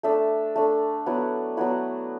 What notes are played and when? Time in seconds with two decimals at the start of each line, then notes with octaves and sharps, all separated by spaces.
0.03 A3 D4 E5
0.56 A3 D4
1.06 F#3 B3 E4 F#5
1.57 F#3 B3 E4 F#5